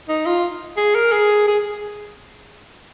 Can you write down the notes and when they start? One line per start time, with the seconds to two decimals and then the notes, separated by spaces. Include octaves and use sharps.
0.09 D#4
0.26 F4
0.77 G#4
0.95 A#4
1.12 G#4
1.48 G#4